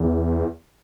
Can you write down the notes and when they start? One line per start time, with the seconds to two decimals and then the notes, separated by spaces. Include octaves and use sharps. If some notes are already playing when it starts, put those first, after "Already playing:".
Already playing: E2